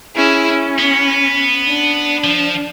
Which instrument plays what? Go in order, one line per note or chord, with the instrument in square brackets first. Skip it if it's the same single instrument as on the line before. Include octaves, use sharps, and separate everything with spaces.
[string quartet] C#4 E4 G#4
C#4
[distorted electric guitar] B3
[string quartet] D4
[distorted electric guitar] F3